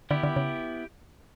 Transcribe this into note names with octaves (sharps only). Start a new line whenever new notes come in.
D3 B3 E4 G4
D3
C#3